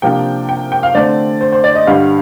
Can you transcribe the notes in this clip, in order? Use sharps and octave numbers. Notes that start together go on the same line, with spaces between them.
C3 F3 A#3 D4 G5
G5
G5
F5
D3 A3 C4 D5
C5
C5
D5
D#5
G2 D3 G3 F5